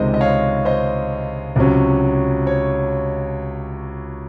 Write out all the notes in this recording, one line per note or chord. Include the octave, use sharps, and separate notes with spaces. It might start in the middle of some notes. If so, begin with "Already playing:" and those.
Already playing: C#2 C3 D#3 G#3 C5 D#5
D#5
C#5 F5
C5 D#5
C#2 C3 F#3 C#4
C#5